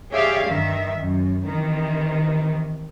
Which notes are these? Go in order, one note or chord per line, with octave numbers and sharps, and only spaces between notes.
G4 G#4 C#5 D5 E5 F5
G2 D#3 E5
F#2
C3 D#3 E3